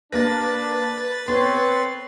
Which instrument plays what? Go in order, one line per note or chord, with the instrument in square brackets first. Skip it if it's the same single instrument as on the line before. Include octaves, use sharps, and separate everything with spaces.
[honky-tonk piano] A#3 A#6 [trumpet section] D4 [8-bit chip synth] B4 A6
[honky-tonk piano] B3 [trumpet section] C4 C#5 [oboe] C6